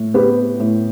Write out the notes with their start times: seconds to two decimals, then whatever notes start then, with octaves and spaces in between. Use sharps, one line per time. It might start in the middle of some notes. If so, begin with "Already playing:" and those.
Already playing: A2
0.14 B3 G4 B4
0.60 A2